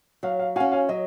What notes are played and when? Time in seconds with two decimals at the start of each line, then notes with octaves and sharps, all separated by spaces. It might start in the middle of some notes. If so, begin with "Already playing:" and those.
0.23 F#3 F5
0.39 F5
0.56 F#4 F5 G#5
0.60 C#4
0.72 F5 G#5
0.89 F#3 D#5